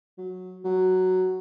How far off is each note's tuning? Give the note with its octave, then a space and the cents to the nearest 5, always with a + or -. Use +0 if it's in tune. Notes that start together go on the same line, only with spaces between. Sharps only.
F#3 -10
F#3 +5